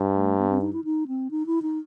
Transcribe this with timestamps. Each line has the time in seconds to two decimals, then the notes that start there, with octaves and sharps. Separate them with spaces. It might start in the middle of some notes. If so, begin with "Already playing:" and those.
Already playing: G2
0.14 A3
0.38 B3
0.50 C4
0.61 D#4
0.73 E4
0.84 D#4
1.08 C4
1.31 D#4
1.46 E4
1.62 D#4